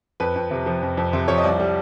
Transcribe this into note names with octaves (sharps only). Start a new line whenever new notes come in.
F2 B4
F2
C3
F3
F2
F2
C3 C5
F3 C#5
D#5
C2 D5
G3